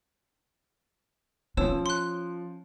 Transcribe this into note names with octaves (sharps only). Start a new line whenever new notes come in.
F3 C#4 C#5 E6 E7
C6 F#6